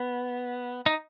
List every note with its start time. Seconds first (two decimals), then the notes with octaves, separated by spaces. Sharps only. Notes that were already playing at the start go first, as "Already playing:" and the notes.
Already playing: B3
0.86 D#4